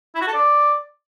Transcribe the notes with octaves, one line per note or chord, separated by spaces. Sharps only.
E4
F#4
A4
D5